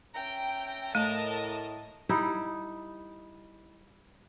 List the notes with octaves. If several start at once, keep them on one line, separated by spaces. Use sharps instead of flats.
C#4 E5 G5 A#5
A2 A3 A#4 D#5 A5
G3 D#4 E4